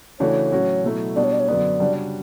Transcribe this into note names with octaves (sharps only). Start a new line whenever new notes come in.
C#3 E3 A3 D4 F#4 C#5
A2 F#3 C#4 F#4
B2 F#3 A3 E4
B2 G3 D4 D5
C#5
D5
C#5
F#2 D3 F#3 B3 D5
C#3 G3 D4 F#4